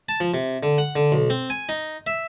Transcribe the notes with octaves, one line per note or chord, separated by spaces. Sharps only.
A5
F3
C3
D3
F#5
D3
B1
C4
G#5
D#4
E5